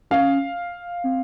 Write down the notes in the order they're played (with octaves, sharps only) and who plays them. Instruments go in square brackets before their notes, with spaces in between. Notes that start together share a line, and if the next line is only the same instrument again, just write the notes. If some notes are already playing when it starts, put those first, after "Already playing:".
[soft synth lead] C#4 [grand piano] F5
[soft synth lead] C4